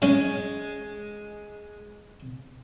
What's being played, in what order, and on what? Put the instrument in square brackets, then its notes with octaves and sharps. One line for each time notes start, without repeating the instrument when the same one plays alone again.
[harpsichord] A2 C#4 D#4 [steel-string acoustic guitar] G#3